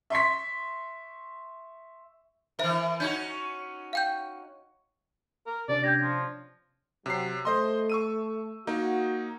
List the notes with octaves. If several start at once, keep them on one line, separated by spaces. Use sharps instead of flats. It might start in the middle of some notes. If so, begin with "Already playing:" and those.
E5 C6 C#6 B6
E3 A#4 C5 E5
C#4 D#4 F#4 G6 G#6
F5 G5 G6
A#4
C3 C#4 D4 D5
G4 G6 G#6 A#6
F3
C3 F#3 C7
A3 C5 D#5 C6
C#6 E6 D#7
A#3 D#4 F#4